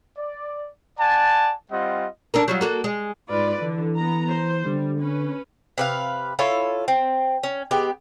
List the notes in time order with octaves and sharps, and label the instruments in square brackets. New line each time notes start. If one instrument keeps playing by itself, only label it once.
[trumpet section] D5
D5 F#5 G#5 A5
G3 C4 F4 D#5 F#5
[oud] D4 A4 A#4
F#3 G3 F4
A#3 F#4 A4
G#3
[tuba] G#2 [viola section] F4 B4 D5
[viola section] D3 [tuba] E3
[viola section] B3 A#5
C5
[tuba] D3 [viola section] G3
[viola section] C#4 B4
[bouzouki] C3 B4 F5
E4 F4 A4 C#5
C4
C#4
G#3 B3 G4